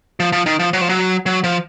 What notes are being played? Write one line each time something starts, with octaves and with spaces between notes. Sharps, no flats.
F3
F3
D#3
F3
F#3
F3
F#3
F#3
F3